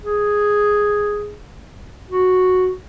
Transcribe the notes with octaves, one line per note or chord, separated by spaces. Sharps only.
G#4
F#4